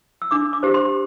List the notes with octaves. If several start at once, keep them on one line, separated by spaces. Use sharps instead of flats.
E6
D4 D6
D6
G4 C5
C6